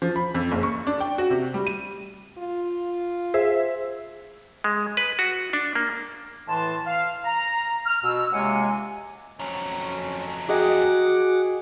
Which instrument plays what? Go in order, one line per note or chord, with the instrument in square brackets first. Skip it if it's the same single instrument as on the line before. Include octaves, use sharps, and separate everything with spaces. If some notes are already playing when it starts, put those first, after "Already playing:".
[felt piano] F3
B5
F2
F#1
C#6
D4
G5
F#4
C3
G3
D#7
[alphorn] F4
[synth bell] G#4 C5 [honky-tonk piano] E5
[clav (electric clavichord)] G#3
B4
F#4
D4
A#3
[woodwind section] A2 E3 A5 C6
F5
A#5
F6
B2 E6
C#2 C3 G#3 A#3 F#5 G#5
[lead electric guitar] F2 F#3 [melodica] C#4
[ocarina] F#4 [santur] G#4 D#5 G5 [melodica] F#5 D6